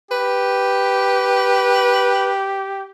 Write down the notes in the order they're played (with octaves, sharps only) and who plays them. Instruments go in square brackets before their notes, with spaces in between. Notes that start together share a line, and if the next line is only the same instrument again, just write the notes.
[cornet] G4 [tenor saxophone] B4